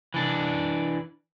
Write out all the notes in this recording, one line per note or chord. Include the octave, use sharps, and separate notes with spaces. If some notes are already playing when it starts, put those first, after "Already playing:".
E3 D4